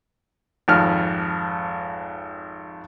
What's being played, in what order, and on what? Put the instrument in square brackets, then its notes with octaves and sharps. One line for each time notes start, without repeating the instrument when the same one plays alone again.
[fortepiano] G#1 F2 F6